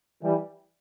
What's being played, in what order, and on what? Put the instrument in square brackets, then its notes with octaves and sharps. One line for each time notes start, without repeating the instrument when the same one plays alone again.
[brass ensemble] E3 G3